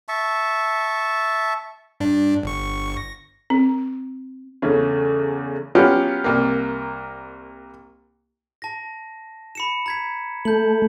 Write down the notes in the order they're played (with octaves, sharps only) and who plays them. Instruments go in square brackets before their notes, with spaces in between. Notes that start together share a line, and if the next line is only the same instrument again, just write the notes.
[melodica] E5 A5 C#6
[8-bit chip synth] G2 D4
G1 C#6
A#6
[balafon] C4
[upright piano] E2 C#3 A3 C#4
[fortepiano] F#3 B3 C#4 F4 G4
C2 A#3
[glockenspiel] A5 A#6
B5 C#7 E7
A#5 G#6 B6
[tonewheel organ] A3 [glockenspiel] G6 F#7